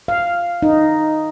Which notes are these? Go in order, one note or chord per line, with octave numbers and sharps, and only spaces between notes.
F5
D#4